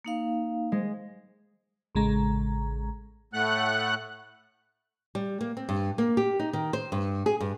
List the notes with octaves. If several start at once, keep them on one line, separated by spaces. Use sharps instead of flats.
A#3 D#4 F5
G#3
A1 C#3 G#3 A#5
A2 A3 F#5 F#6
G3
A#3
C4
G2
A#3
G4
D#4
D#3
C5
G2
G#4
G2